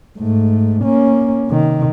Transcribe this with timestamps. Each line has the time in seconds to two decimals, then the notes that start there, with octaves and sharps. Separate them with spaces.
0.18 G#2 A3
0.83 A#3 C#4
1.47 C3 D#3